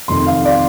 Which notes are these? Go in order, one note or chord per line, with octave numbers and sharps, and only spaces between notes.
F1 F2 D#3 C6
F5
D5